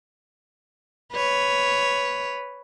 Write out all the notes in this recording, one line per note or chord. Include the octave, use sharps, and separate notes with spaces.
B4 C#5